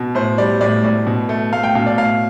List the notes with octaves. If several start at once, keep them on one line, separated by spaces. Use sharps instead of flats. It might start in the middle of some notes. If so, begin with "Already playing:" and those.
Already playing: B2
A2 C5
G3 D5
A2 D5
A2 D5
B2
A3
A3 F5
G5
B2 F5
D5
A2 F5